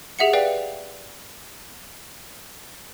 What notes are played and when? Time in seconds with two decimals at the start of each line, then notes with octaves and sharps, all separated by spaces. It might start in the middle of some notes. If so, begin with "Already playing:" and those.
0.19 G4 G#4 E5 F#5 C#7
0.33 B4 D5 F5 G5